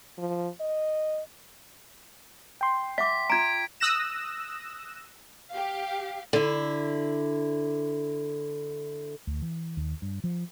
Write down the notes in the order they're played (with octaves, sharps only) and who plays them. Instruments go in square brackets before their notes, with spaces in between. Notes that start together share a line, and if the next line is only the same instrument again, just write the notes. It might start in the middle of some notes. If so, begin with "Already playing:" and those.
[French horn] F3
D#5
[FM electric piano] G5 C6
[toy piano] E5 F#5 D6 [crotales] B6
[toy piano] F4 A#5 [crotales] G#6 D7
[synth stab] D#6 E6 F#6 A#6 E7
[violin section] G4 F5
[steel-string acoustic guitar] D3 E4
[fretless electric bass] D2
E3
D#2
G2
F3